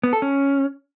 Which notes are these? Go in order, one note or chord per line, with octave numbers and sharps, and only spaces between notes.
B3
A4
C#4